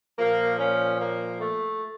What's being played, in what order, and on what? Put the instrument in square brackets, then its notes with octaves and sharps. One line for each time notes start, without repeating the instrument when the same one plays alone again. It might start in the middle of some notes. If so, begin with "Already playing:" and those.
[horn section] A#2 F3 A#3
C#4
A#3
A3